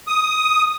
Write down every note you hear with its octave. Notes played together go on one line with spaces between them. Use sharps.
D#6